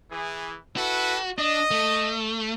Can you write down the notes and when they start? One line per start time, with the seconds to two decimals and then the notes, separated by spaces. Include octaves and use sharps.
0.11 E3 G#4
0.76 E4 F#4 A4 B4
1.38 D4 D#5
1.71 A3